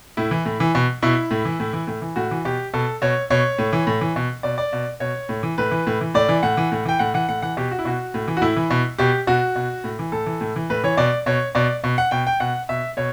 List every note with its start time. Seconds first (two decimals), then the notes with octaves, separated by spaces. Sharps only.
0.17 A2 E4
0.31 E3
0.45 A2
0.60 E3
0.75 B2
1.02 B2 E4
1.31 A2
1.45 E3
1.60 A2
1.73 E3
1.87 A2
2.02 E3
2.16 A2 F#4
2.31 E3
2.45 B2 G4
2.74 B2 A4
3.02 B2 C#5
3.30 B2 C#5
3.58 A2
3.73 E3
3.87 A2
4.01 E3
4.16 B2
4.43 B2 D5
4.58 D5
4.73 B2
5.00 B2 C#5
5.29 A2
5.43 E3
5.58 A2 B4
5.71 E3
5.87 A2
6.01 E3
6.14 A2 D5
6.29 E3
6.43 A2 F#5
6.57 E3
6.72 A2
6.85 E3 G5
6.99 A2 F#5
7.14 E3 F#5
7.29 A2 F#5
7.42 E3 F#5
7.57 B2 G4
7.71 F#4
7.79 E4
7.85 B2 F#4
8.14 A2
8.28 E3
8.37 F#4
8.41 A2 E4
8.56 E3
8.70 B2
8.98 B2 G4
9.27 B2 F#4
9.56 B2
9.84 A2
9.99 E3
10.12 A2 A4
10.26 E3
10.41 A2
10.56 E3
10.70 A2 B4
10.84 E3 C#5
10.97 B2 D5
11.26 B2 C#5
11.55 B2 D5
11.84 B2
11.98 F#5
12.11 B2 G5
12.27 G5
12.40 B2 F#5
12.69 B2 E5
12.97 B2 C#5